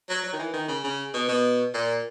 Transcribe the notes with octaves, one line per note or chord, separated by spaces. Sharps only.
F#3
F#3
D#3
E3
D#3
C#3
C#3
B2
B2
A#2